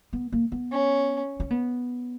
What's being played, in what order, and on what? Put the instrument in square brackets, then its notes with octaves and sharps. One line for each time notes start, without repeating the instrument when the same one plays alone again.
[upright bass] B3
A#3
B3
[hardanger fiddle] C#4
[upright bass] C#4
B3